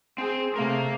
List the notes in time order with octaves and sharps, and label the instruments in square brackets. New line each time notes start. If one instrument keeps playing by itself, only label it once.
[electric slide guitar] C4 [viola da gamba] G#4
[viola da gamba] C3 A3 [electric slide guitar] A#4 F5